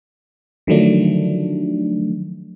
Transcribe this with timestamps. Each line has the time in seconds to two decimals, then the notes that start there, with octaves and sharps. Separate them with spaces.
0.67 D3 D#3 F3 F#3 A3 D4